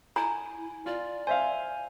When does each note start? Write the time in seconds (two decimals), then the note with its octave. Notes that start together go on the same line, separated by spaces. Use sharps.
0.16 E4 G#5 A#5
0.86 F4 D5
1.27 C5 E5 F5 G#5